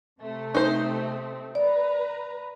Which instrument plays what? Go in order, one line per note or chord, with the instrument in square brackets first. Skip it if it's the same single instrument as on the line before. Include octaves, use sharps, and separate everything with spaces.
[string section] C3 A3 C4
[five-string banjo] D#4 C5
[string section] B4 A#5 [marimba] D5